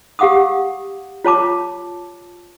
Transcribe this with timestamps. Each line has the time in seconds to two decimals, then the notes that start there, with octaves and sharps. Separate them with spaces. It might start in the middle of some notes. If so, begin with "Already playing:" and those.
0.19 G4 F5 F#5 D6 D#6
1.24 F4 C#5 A5 D6